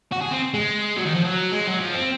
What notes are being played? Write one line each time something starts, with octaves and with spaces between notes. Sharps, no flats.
F#4
G#4
C4
G#3
F#3
D#3
F3
F#3
G#3
F#3
F3
C4